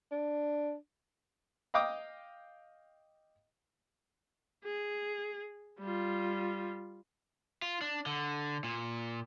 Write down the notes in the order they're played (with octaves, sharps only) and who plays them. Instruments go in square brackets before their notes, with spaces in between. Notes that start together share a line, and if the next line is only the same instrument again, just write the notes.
[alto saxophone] D4
[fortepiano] D#5 F5 G5 D6 D#6
[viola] G#4
G3 F4
[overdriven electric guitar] F4
D4
D3
A#2